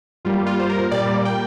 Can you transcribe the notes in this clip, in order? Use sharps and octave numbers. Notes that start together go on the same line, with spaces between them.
G2 G3 A#3 F4
F4
C5
A#4
A#2 G3 A#3 D5
G5